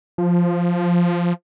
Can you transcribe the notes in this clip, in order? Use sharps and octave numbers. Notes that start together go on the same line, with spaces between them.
F3